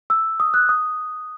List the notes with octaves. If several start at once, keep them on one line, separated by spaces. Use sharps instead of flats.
E6
D#6
F#6
D#6